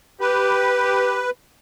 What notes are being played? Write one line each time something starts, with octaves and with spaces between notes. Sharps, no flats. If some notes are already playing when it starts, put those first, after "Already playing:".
G4 B4